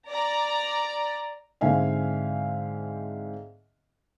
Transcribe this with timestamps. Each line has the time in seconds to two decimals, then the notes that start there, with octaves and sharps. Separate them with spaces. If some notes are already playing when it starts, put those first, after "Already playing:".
0.11 D5 A#5
1.61 G#2 D3 C4 E5 F5 G#5